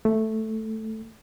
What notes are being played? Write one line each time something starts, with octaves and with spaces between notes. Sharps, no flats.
A3